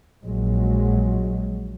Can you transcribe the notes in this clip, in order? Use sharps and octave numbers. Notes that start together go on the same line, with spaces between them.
A#1 F#3 G#3